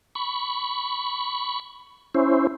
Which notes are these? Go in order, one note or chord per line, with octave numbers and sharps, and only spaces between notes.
B5 C#6
C#4 E4 C5